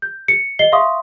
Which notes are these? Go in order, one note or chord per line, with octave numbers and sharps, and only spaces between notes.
G6
C#7
D#5 C7 G7
E5 F5 C6 C#6 D#6